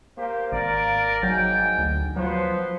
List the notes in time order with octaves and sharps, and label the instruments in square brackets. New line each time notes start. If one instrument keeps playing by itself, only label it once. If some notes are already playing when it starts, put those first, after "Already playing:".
[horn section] A#3 G4 C5
[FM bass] G#1 [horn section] A#3 A#4 D5
[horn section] G#2 G5 G#5 [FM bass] F#3
[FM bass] D2
[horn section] F3 B3 C5 [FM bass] F#3